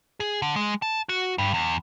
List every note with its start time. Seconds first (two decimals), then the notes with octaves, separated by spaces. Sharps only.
0.20 G#4
0.42 D3
0.56 G#3
0.82 A5
1.09 F#4
1.38 G2
1.54 E2